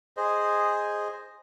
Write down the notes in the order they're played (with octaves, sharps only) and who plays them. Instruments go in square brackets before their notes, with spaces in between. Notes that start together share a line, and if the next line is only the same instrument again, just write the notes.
[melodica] G#4 C5 D#5